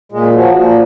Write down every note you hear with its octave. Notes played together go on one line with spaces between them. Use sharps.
A#2 G#3
F3 F#3
A#2 F3